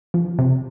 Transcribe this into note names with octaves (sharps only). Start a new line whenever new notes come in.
F3
C3